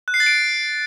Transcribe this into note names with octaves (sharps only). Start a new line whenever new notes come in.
F#6
C7
A6
D7